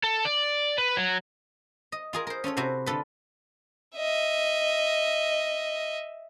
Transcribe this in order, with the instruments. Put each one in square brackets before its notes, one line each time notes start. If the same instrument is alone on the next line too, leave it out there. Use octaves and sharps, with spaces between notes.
[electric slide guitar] A4
D5
B4
F#3
[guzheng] D#5
F4 G#4 A#4
A#4 C5
C#4 F4 A4 C#5
C3 E4 F#4 C5
D3 F4 A4 B4
[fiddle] D#5 E5